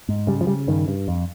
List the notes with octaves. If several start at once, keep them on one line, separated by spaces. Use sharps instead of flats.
G#2
C#3 G3
F3
C#3 G3
G2 D#3
G2
F2